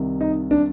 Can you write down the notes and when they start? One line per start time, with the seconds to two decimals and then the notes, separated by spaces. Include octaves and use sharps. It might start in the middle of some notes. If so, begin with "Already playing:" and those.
Already playing: C2 C3 D#3
0.21 D#4
0.51 D4